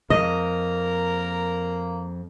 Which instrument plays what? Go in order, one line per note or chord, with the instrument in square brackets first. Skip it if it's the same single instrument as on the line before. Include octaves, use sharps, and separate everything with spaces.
[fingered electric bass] F2 [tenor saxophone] A#3 [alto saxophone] A#4 [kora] D#5